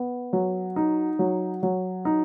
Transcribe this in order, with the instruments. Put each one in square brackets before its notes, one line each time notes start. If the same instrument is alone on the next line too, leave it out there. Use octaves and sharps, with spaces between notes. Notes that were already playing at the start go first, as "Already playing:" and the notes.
Already playing: [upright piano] B3
F#3
D#4
F#3
F#3
D#4